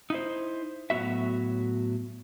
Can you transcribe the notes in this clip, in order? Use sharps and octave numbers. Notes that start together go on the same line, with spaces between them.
D#4 E4 C5
A2 F#3 B3 F#4 E5